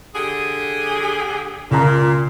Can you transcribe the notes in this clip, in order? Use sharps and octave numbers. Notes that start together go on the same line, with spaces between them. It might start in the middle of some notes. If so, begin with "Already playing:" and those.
D3 G4 G#4
C#2 A#2 A#5